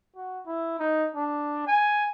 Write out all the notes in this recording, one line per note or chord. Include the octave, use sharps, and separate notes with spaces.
F#4
E4
D#4
D4
G#5